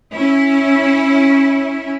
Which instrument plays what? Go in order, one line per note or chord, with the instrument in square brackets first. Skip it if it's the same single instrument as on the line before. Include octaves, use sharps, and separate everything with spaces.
[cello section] C#4 E4